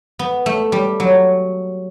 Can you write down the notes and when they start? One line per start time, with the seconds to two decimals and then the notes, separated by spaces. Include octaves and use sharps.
0.19 B3
0.46 A3
0.72 G3
1.00 F#3